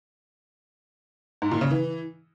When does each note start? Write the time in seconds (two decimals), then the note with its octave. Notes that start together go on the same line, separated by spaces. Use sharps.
1.42 G#2
1.52 A#2
1.61 C#3
1.71 E3